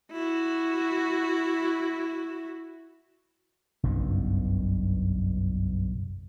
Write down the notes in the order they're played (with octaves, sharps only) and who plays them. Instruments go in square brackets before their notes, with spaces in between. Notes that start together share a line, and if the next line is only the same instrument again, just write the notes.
[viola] E4 F#4
[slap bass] F#1 B1 G2 B2